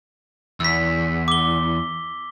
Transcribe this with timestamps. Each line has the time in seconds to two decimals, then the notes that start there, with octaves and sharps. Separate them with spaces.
0.60 E2 E6 B6
1.28 D6 G7